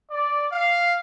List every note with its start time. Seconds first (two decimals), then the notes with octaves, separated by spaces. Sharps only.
0.10 D5
0.52 F5